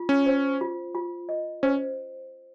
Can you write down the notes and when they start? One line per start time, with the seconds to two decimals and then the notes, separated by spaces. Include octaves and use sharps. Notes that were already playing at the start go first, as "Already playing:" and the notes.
Already playing: F4
0.09 C#4
0.26 C5
0.61 F4
0.95 F4
1.29 D#5
1.63 C#4 C5